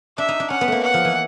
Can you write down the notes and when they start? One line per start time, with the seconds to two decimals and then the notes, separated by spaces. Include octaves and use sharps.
0.18 D4 E5
0.28 D#4
0.40 D4
0.50 C#4 F#5
0.61 B3
0.68 A3 A#3
0.84 F#5
0.94 F3
1.05 E3